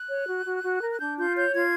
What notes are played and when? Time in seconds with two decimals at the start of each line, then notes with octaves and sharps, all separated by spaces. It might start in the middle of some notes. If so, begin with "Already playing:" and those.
Already playing: F#6
0.09 C#5
0.28 F#4
0.45 F#4
0.64 F#4
0.81 A#4
0.90 F#6
0.99 D4 G6
1.17 F4 G6
1.35 C#5 G6
1.53 F4 G#6